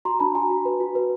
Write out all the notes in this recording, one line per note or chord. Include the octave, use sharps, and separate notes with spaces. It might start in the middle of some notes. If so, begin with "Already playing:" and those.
F#4 A#5 C6
D4 A5 B5
F#4 G#5 A#5
F#4
B4
F#4
B4